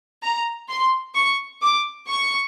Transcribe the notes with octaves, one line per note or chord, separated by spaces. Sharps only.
A#5
C6
C#6
D6
C#6